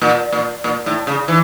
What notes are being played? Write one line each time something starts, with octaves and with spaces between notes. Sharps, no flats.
A#2
A#2
A#2
A2
C#3
E3